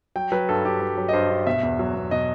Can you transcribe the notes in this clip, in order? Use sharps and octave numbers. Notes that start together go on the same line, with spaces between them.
F#3 G5
F#3 B4
G2 A4
G2 G4
F#3
F#3
D#5
G2 C5
G2
B2 E5
E2
F#3
E2
B2 D#5